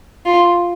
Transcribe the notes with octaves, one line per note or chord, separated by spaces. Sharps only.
F4